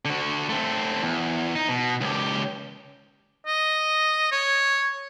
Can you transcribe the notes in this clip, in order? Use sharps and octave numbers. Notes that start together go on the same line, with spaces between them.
D3 F#4
A3 C4
E2
D#4
B2
C#2 G4
D#5
C#5